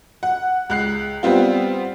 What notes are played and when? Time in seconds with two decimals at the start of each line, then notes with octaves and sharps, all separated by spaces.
0.23 F#5
0.70 C#2 F#6 C7
1.23 G3 B3 C4 F4